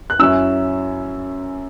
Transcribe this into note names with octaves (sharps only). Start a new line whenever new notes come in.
F#6
F#2 F#3 C#4 E4 E6